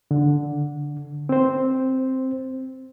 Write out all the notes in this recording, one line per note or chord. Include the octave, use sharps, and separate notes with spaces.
D3
C4 C5